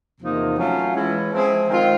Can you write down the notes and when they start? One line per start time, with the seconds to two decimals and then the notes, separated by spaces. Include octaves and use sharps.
0.20 E2 C3 F3 A#3 D#4
0.57 F#3 A3 C#4 F4
0.94 E3 G#3 C#4 E4
1.32 F3 G#3 C4 E4 G#4
1.69 D#3 G#3 C4 F4